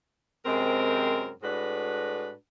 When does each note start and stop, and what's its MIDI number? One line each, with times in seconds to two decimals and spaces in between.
0.45 1.32 42
0.45 1.32 48
0.45 1.32 56
0.45 1.32 60
0.45 1.32 70
1.43 2.33 45
1.43 2.33 56
1.43 2.33 62
1.43 2.33 66
1.43 2.33 71